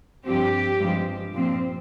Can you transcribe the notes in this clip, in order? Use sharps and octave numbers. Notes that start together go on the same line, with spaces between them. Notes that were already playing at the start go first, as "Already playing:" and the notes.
G2 F3 C4 G4
G2 F3 G#3 C4
A#2 F3 C4